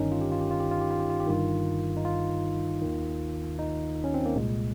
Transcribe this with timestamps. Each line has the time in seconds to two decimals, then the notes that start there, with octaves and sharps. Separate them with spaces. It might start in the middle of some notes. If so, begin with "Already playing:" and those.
Already playing: G1 G2 D#3 C#4 D#4
0.12 F4
0.21 G4
0.32 F4
0.41 G4
0.51 F4
0.60 G4
0.71 F4
0.81 G4
0.91 F4
1.00 G4
1.10 F4
1.20 G4
1.27 G1 G2 D#3 F4
1.97 D#4
2.05 F4
2.82 D#2 D#3
3.59 D#4
4.04 C#4
4.14 C4
4.26 A#3
4.36 C2 A#2 G#3